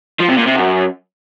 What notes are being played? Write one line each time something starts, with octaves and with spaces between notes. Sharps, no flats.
F3
C3
A#2
C3
F#2